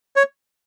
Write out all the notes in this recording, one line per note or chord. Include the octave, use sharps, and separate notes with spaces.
C#5